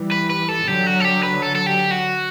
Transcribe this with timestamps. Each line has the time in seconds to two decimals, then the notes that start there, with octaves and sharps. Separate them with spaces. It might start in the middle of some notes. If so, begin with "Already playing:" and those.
Already playing: E3 G3
0.12 B4
0.30 B4
0.49 A4
0.67 D3 F#3 G4
0.86 F#4
1.00 A4
1.04 G4
1.23 B4
1.42 A4
1.55 A4
1.66 G4
1.91 F#4